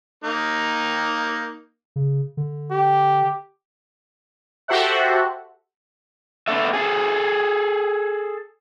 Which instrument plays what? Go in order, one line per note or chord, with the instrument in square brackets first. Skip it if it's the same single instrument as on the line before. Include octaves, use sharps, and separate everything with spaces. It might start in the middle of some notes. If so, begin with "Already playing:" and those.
[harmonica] A#3 D#4
[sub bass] C#3
D3
[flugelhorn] G4
[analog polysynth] F#4 G4 A4 C5 E5 F#5
[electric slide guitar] B3 C4 D4 A4 E5
G#4 A4